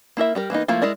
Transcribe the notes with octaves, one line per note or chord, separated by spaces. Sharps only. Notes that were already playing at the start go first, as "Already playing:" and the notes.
A#3 E4 A#4 E5
G3 G4 A#4
E3 A#3 B3 D#4
F3 A3 A#3 E4 F4
G#3 E4 A#4 D5